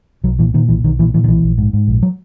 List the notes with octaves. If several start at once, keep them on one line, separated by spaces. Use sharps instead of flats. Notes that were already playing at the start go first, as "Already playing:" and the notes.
B1 F#3
A#2 E3
A#2 D#3
B1 E3
B1 D#3
A#2 E3
A#2 E3
D#3
B1 E3
A#1
G#2
G#2
A#1
F#3